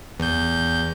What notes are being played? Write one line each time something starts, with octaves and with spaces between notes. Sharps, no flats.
E2 G6